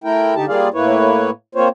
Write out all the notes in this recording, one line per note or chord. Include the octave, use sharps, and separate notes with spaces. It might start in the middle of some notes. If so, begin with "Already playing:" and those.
A3 E4 A#4 G5
D3 D#4 G4 A5
G3 A#3 F4 G#4 D5 F5
A2 A#3 E4 B4 C#5
A#3 C4 F4 C5 C#5